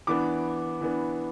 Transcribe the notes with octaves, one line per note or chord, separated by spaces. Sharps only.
E3 B3 D4 D6
E3 B3 D4